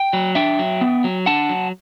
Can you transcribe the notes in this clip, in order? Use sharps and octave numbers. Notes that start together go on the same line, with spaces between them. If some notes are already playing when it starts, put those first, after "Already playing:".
Already playing: G5
F#3
D4 E5 G5
F#3
B3
F#3
D4 F#5 A5
F#3